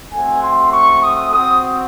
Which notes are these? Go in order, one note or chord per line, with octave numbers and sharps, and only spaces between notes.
A3 C4 F#4 G#5
C6
C#6
D#6
C4 F#4 D#6